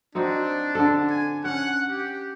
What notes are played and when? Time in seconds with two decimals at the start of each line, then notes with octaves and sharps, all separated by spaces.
0.15 C4 D4 D#4 F#4
0.75 D3 A4
1.10 G#5
1.44 C#4 F#5
1.89 G4